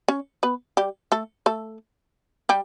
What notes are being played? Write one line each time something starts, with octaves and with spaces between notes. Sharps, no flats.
C#4 C#5
B3 B4
G3 G4
A3 A4
A3 A4
G3 G4